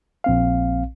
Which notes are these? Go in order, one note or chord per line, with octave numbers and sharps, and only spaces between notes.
A#1 C4 F5